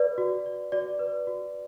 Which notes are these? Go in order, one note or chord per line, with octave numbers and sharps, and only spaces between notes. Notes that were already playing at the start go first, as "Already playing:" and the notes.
Already playing: B4 D5
F#4
D5
F#4 D5
B4
F#4